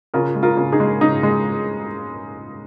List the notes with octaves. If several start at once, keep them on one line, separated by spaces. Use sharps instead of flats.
C#3 F4 A#4
G#3
F4 A#4
C#3
D#4 G#4
G#3
C#3 D#4
G#3